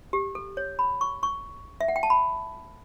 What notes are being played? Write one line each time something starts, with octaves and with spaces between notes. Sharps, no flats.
G4
A4
C#5
B5
C#6
C#6
E5
F#5
G5
A5
B5